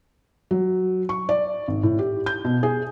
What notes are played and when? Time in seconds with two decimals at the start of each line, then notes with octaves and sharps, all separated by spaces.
0.51 F#3
1.09 C#6
1.29 D5
1.68 G#1
1.83 A2
1.99 G4
2.26 G6
2.45 B2
2.63 G#4